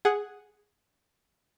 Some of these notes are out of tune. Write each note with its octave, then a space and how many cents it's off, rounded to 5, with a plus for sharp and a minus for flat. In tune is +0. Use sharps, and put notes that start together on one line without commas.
G#4 +0 F#5 +0